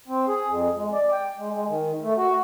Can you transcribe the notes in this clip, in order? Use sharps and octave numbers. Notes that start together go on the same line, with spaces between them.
C4
G#4
F2
G#3
D5
G5
G#3
G#3
D#3
A3
F#4